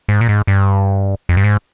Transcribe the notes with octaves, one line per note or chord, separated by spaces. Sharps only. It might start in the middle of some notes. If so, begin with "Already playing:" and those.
G#2
A#2
G#2
G2
F2
G2
G#2